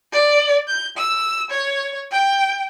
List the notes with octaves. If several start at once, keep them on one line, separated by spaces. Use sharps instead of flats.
D5
G6
E6
C#5
G5